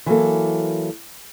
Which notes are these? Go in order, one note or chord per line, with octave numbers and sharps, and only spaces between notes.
E3 F#3 A#3 A4